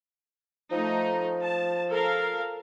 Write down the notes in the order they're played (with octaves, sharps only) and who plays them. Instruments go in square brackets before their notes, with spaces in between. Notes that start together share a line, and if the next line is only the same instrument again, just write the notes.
[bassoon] F3 [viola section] A3 D#4
[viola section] A5
A4 A#4 F5